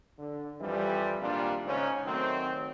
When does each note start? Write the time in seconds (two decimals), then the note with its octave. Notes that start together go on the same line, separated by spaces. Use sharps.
0.19 D3
0.61 F2 E3 F3 G3
1.21 G#1 A#2 G3 A#3 D4 F4
1.66 G#2 C#3 C#4
2.06 D#3 F#3 A3 C4